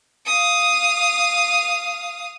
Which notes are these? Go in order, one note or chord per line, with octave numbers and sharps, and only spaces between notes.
F5 D#6